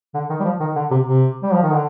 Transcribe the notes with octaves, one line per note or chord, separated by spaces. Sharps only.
D3
D#3
G3
F3
D#3
D3
C3
C3
G3
F3
D#3
D3